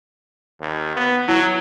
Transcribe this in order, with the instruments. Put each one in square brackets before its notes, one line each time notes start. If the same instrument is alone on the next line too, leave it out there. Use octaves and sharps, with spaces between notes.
[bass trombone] D#2
B3
[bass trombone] F#3 [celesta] E4